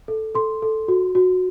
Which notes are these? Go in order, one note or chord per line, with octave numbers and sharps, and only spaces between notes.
A4
A4 C6
A4
F#4
F#4